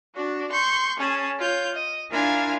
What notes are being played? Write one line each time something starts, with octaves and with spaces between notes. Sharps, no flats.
D4 F#4
C6 C#6 G6
C#4 G#4 A5
F4 C#5 G6
D#5
D4 E4 F4 A#4 F5 G#5